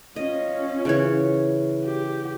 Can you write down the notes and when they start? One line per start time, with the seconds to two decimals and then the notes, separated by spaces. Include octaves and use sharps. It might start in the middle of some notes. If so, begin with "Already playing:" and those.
0.16 C#4 F4 D#5
0.85 C#3 E3 C#5
1.84 G4